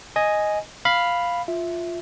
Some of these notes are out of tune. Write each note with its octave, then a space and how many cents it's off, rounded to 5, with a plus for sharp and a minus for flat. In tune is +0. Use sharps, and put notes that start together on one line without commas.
D#5 +0 G#5 +0
F5 +0 B5 +0
F4 +0 E5 +0